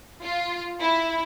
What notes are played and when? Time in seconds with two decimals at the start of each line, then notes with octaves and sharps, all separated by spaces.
0.22 F4
0.80 E4